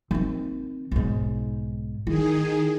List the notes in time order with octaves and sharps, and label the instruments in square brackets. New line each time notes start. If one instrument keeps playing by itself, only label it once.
[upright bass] D#3 C4
B1 G#2
[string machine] D#3 G#4 [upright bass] E4